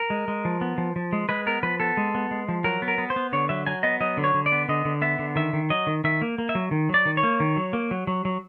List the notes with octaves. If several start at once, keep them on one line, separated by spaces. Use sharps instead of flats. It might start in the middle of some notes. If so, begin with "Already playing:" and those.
Already playing: A#4
G#3
G#3
F3
B3
F3
F3
G#3
G#3 B4
B3 A#4
F3 B4
B3 A4
G#3
B3
G#3
F3
F#3 A#4
B3
A#4
B3
C5
B3
D3 C#5
F#3 E5
F#3 G#5
B3 D#5
F#3 D#5
D3
C#5
D3
D5
B3
D3 D#5
D3
B3 E5
D3
D#3 E5
D#3
F#3 D#5
D#3
D#3 E5
A#3
A#3
E5
F#3
D#3
F#3 D5
D#3
C#5
A#3
D#3
F#3
A#3
F#3
F#3
F#3